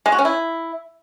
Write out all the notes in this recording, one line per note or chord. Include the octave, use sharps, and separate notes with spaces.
G#3
F#4
C#4
E4